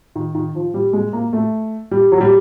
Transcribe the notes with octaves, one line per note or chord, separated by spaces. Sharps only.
D#3
D#3
F3
G3
G#3
A#3
A3
G3
F#3
G3